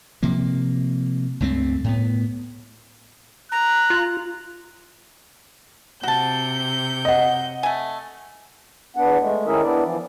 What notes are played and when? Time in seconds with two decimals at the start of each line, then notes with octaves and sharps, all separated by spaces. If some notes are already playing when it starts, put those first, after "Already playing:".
0.23 C3 F3 A#3
1.40 C#2 G2 A3 C4
1.84 A2 B3
3.52 A#5 F#6
3.90 F4
6.03 C3 F#4 A5 G6
7.05 D#5 F#5
7.63 A3 G#5
8.96 E2 B3 D4 F#5
9.20 G#3 A3
9.46 D#3 C#4 E4 G#4 A#4 E5
9.62 B3 D4 E4 D5
9.84 E3 F3